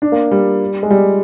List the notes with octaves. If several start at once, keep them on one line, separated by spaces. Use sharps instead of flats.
D4
A#3
G3
G#3
G3